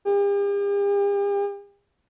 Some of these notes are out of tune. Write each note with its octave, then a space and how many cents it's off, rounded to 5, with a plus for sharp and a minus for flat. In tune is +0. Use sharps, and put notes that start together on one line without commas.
G4 +45